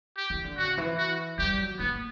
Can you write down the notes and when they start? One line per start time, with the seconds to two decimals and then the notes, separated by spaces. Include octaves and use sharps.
0.17 G4
0.30 E3
0.44 D3
0.57 C#3 F#4
0.78 E3
0.98 F#4
1.38 G3 G4
1.58 F#3
1.79 A#3 B3